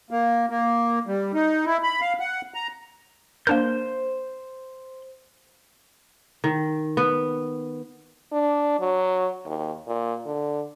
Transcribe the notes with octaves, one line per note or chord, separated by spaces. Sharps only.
A#3
A#3
G3
D#4
E4
B5
F5
F#5
A#5
A#3 D4 A#4 C5 G6
D#3
B3
D4
F#3
D#2
A#2
D3